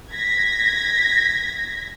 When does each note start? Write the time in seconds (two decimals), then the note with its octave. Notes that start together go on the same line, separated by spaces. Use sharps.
0.12 G#6 A#6 B6